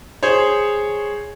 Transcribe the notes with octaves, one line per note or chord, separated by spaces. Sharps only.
G#4 C5 C#5